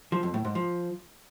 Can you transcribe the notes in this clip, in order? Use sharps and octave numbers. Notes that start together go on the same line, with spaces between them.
F3
F2
A2
G#2
F3